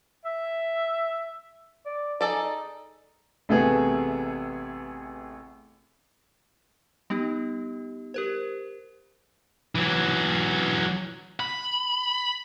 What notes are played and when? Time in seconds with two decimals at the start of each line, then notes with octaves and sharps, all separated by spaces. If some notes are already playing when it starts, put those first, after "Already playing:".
0.25 E5
1.86 D5
2.21 D#4 G#4 A4 D5
3.49 A1 C3 A3 B3 G#4
7.10 G3 B3 D#4 G4
8.14 G4 A#4 C5
9.75 E3 F#3
11.40 B5